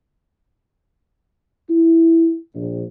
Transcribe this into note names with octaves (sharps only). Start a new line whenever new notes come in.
E4
A#1